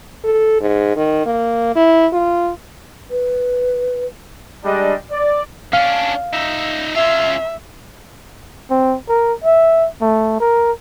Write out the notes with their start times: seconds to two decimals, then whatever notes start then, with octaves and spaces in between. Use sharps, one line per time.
0.24 A4
0.61 G#2
0.96 D#3
1.26 A#3
1.76 E4
2.13 F4
3.11 B4
4.64 G3 G#3 D4 D#5
5.11 D5
5.73 C#4 D4 F5
6.33 D#4 E5
6.95 C#4 F4 E5
8.70 C4
9.09 A#4
9.44 E5
10.02 A3
10.40 A#4